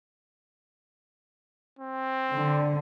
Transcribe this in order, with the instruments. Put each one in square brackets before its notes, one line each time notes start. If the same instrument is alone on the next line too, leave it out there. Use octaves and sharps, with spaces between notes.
[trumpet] C4
[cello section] D3